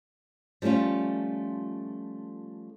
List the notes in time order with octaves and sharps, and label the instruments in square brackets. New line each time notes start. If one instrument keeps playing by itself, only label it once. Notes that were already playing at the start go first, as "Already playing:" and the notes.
[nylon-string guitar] F3 G3 A3 C#4 F4